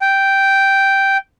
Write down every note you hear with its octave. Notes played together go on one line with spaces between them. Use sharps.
G5